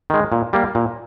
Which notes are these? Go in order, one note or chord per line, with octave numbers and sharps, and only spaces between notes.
D#3 G#3
A#2
G3 A#3
A#2